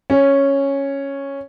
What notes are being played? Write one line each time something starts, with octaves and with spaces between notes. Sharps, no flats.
C#4